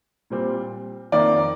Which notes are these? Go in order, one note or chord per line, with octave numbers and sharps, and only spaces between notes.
A#2 G3 C4
F2 D#3 A#3 D5